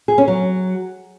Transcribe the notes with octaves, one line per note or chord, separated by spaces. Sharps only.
G#4
C#4
F#3